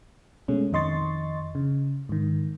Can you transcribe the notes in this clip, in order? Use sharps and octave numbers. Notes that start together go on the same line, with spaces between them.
B2 G#3 A3 C#4
F2 D#3 D#5 C6 C#6 A6
C#3
G#2 D#3